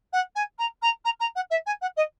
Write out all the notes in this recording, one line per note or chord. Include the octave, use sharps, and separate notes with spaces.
F#5
G#5
A#5
A#5
A#5
A#5
F#5
E5
G#5
F#5
D#5